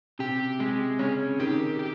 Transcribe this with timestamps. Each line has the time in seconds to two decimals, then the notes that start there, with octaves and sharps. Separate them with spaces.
0.19 C3 G4
0.59 C3 G#3
0.99 C#3 C#4
1.39 D#3 G4
1.79 G4